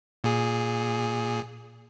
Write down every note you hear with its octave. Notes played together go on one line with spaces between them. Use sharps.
A#2 G#4